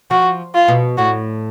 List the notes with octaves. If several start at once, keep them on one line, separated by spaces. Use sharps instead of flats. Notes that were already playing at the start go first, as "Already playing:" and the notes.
F3 F#4
F4
B2
A2 F#4